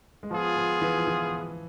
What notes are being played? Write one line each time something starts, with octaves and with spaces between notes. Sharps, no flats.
G#3
F3 B3 F4 G#4
F3
E3
F3
E3